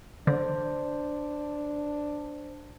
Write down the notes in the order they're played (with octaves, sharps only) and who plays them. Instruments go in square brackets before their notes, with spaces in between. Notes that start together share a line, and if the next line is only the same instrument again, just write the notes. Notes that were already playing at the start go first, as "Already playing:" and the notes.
[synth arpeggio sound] D3 [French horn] D4 [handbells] C5